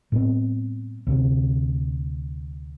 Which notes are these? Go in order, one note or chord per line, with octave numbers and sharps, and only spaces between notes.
A2 G3 B3 C4
D2 C3